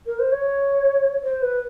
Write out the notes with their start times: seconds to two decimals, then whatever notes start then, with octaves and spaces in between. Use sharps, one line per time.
0.06 A#4
0.19 C5
0.32 C#5
1.23 C5
1.42 B4